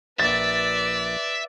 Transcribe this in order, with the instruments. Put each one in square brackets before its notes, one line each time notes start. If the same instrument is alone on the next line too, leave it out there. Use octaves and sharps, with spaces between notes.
[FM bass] A#1 [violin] B4 D5 [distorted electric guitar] E5 [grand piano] A6